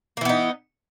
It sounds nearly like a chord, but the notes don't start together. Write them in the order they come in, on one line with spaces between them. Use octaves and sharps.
A#3 E3 B3 D#4